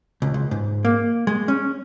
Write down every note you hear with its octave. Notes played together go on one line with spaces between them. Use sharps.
C#2
C#2
G#2
A#3
G#3
C#4